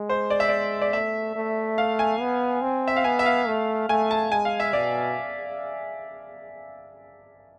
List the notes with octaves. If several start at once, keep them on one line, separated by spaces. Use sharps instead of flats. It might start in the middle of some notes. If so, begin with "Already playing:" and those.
Already playing: G#3
C5
D5
E5
D5
D5
A3 E5
A3
F5
G#5
B3
C4
E5
F5
B3 G#5
E5
F5
A3
A3 G#5
A5
G#3 G#5
F5
E5
B2 D5